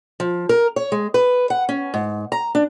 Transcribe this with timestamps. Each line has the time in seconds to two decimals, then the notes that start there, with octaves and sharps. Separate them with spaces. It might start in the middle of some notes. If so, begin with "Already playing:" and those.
0.20 F3
0.49 A#4
0.76 C#5
0.92 G#3
1.14 B4
1.50 F#5
1.69 C#4
1.94 G#2
2.32 A#5
2.55 D4